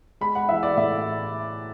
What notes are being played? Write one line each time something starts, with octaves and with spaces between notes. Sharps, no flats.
G#3 B5
F#5
E3 E5
D5
A2 E5